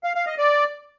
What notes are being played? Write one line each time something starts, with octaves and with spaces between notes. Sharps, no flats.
F5
F5
D#5
D5